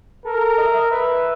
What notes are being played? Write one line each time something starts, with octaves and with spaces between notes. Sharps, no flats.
A4 A#4
D#5
E5
D#5
B4 E5